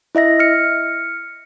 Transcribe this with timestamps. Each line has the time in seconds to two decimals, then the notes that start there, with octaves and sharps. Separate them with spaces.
0.15 E4 D#5 E5 A#6
0.39 F6 C#7